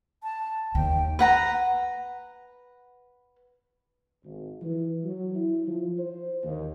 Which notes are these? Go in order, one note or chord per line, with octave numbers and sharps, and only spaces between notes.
A5
D#2 D#3 G5
B4 F#5 A#5
G#1
E3
F#3
E4
F3
C5
D#2